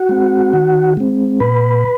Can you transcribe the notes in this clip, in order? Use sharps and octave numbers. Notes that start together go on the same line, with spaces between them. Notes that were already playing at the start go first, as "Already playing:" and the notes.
Already playing: F#4 F#5
G#3 C4
D#3
G#3 C4
A#2 B4 B5